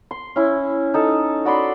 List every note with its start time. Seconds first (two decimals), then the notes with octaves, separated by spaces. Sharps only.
0.11 C6
0.36 C#4 E4
0.94 D#4 A4
1.45 F#4 D5 B5 C6